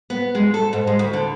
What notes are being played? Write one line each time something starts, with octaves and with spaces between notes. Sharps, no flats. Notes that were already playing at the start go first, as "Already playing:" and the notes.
B3
G#3
A4
G#2
G#3
D2
D3